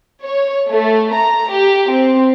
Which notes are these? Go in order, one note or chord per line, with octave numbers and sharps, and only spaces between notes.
C#5
A3
A#5
G4
C4